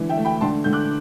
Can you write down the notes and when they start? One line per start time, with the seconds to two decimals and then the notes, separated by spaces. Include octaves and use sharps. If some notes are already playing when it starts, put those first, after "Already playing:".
Already playing: D3 E3
0.09 E5 G5
0.17 A3
0.25 G5 B5
0.41 D3 A5 C6
0.64 D3 G6
0.73 D6 F#6